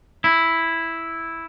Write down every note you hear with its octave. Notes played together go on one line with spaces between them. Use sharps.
E4